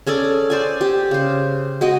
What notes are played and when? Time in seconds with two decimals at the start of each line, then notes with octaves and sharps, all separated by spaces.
0.07 C#4 G#4 A4 D5
0.50 C5 D5 G#5
0.81 G4
1.11 C#3 C5
1.81 G#3 F#4 D#5